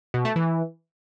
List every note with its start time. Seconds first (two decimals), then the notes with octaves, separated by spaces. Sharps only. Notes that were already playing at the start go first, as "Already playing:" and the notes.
0.14 B2
0.25 A3
0.36 E3